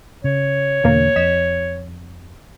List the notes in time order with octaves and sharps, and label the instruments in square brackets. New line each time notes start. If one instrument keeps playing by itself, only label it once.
[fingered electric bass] C#3 [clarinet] C#5
[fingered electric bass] E2 D3 [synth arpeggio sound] B2 A#3 A#4
[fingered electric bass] F2 [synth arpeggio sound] D#5 B6 E7